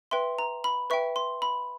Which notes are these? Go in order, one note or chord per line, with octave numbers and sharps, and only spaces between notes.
B4 E5 G5 C6
A#5
B5
B4 E5 G5 C#6
C6
B5